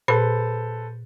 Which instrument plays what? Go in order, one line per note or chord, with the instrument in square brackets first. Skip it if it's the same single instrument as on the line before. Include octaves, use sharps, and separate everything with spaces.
[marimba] A#2 B5 [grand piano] A4 B4 C5